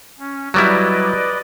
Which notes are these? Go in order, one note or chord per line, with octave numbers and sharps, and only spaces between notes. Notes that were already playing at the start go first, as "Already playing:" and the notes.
C#4
F#3 G3 E4 B4 D5 D#5